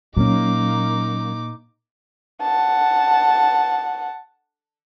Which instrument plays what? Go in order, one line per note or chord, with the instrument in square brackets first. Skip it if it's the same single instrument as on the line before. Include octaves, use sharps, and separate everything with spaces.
[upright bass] A#2 [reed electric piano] F#3 C#4 [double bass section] A#3 [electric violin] D#4 D6
[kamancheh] F#5 A5